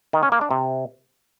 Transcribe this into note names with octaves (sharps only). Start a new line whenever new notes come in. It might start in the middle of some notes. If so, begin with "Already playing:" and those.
D#3
C#4
A#3
D4
C3